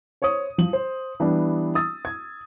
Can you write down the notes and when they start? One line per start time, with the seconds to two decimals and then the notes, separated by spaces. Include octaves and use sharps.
0.22 C5 C#5 C#6 D#6
0.58 F3 F#7
0.73 C5
1.20 E3 G3 B3 D4
1.75 D#6 E6 A6
2.05 G#6